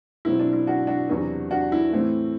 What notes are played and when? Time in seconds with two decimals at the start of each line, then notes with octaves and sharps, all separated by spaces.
0.25 B2 F#3 C4 E4
0.39 D4
0.53 E4
0.67 D4 F#4
0.87 D4 F#4
1.09 E2 C3 F#3 B3
1.51 D4 F#4
1.72 E4
1.92 A2 E3 A3 C4